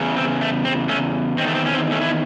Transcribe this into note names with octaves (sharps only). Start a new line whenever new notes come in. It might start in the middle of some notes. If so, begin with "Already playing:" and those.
Already playing: E2 C#3
C4
A3
C4
A3 C#4
E2 D#3 C4
A3
C4
C#4
C4
A3 C#4
E4